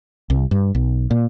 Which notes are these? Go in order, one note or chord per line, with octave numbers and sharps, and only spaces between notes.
C2
G2
B1
A#2